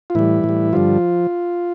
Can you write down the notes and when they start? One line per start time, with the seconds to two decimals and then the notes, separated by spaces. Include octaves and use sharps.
0.10 F4
0.15 A2 E3 G3 E4
0.44 A2
0.49 G3
0.73 G2 D3 F3 G3 F4